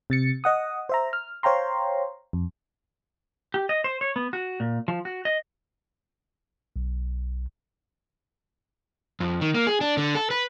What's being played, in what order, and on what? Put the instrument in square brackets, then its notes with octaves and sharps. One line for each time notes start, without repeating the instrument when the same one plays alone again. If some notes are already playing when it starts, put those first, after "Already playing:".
[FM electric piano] C3 A6 C#7
D#5 F#5 D#6
C5 E5 A#5
F6
C5 C#5 F5 G5 A#5 C6
F2
[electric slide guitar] G4
D#5
C5
C#5
B3
F#4
A#2
F3
F#4
D#5
[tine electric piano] B1
[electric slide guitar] F2
D#3
A#3
G#4
D4
D3
A4
B4